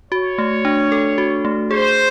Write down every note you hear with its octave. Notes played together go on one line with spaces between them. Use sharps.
F#4 C#5
A3
D4
A4
F#4
A3
G#4 C5